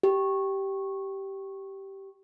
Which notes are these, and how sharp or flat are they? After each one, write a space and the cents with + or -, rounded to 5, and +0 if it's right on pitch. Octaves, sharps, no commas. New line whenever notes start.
G4 -10